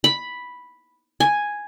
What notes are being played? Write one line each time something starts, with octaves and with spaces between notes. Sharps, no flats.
B5
G#5